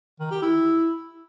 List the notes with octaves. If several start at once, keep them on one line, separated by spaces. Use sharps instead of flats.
D#3
G4
E4